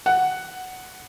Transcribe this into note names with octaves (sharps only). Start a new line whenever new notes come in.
F#5